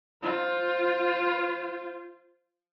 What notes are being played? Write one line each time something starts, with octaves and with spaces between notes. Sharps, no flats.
F4 C5